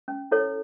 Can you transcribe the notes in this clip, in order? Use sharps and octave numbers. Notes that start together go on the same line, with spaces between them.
C#4
E4 A4 C#5